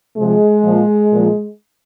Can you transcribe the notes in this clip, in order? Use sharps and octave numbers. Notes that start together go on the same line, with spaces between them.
C3 F3 G#3
A#2 F3
A#2 F3